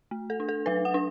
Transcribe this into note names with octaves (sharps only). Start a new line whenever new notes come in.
A3
A4
D4
A4
F#3 B4
F#5
D4